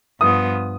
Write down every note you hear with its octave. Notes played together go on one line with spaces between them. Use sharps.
G2 F3 B3 D#6